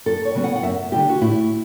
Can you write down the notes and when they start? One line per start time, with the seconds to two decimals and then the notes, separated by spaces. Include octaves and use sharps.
0.06 F#2 A4
0.25 C#5
0.35 C#3 F#3 B3
0.44 F#5
0.56 F#5
0.63 F#2 E5
0.92 D3 G3 G4
1.09 F#4
1.21 A2 E4